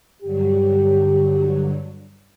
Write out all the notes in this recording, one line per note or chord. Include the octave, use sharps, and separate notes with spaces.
G2 D3 F#3 G4